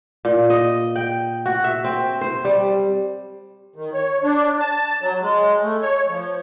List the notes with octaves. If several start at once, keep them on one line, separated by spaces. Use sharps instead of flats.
A#2
D#5
G5
F#4
E5
C4
C5
G3
D#3
C#5
D4
A5
F#3
G#3
A3
C#5
F3